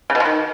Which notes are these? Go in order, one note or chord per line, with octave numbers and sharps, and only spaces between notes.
C#3
B2
F3
D#3